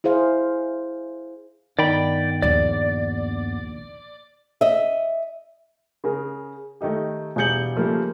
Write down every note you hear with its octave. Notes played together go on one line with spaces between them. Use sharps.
E4 G#4 C5 F5
G2 D#3 B3 D5 G5 B5
A#1 D#2 D5
D#5 E5
C#3 G#4 A#4
D#3 A3 D#4 G4
E1 G3 G#4 G6 C#7 F#7
C#3 F3 G3 A3 A#3